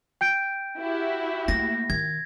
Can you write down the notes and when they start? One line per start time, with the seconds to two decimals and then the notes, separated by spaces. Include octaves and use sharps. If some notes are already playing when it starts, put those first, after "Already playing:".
0.21 G5 G6 D7
0.80 E4 F#4 G4
1.48 A3 A#3 A#6
1.90 D#3 G#6